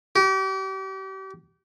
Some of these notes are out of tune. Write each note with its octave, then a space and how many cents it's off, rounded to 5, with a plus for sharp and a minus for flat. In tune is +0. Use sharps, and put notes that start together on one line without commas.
G4 -35